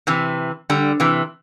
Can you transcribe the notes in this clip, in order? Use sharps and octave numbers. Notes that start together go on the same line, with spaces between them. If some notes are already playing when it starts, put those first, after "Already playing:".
C3 E3
D3 G3
C3 E3